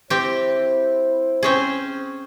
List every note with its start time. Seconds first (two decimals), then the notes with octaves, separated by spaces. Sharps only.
0.10 C4 E4 G4 C5
1.43 C4 C#4 G#4